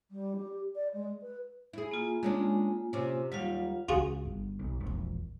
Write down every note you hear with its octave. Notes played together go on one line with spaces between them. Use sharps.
G3
G4
D5
G#3
B4
E4 G#4
A#3 F4 G#5
G#3 C#4 D4
C3 C#4
D#2 F#3 G3 F4 F5
C#2 F4 F#4 G#4
G1
B1
E1 A#1